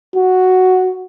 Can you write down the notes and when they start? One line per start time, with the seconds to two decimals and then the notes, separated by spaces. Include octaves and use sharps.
0.16 F#4